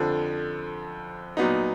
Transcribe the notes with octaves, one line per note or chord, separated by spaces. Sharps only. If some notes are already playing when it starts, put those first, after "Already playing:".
Already playing: F2 D3 F3
A#2 F#3 B3 D#4